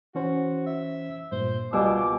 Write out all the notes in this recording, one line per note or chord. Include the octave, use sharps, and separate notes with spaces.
E3 C#4 F#4 C5
E5
G2 A#2 C5
C#2 B2 G3 F4 G#5 D6 E6